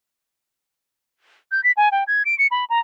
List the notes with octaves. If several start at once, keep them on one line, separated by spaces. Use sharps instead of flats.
G6
B6
G#5
G5
G#6
D7
C#7
B5
A#5